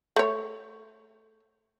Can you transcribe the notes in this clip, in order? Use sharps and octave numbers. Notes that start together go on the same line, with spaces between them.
A3 C#5